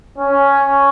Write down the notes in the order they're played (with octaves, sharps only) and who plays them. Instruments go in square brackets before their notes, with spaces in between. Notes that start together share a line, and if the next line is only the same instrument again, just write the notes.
[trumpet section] C#4